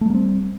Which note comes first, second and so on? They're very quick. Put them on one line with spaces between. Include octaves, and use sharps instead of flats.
A3 G3 A#3 C4